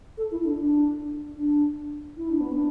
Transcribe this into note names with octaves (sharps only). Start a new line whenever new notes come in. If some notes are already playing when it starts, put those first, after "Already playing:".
A4
E4
D4
D4
D4
E4
D4
B3
D4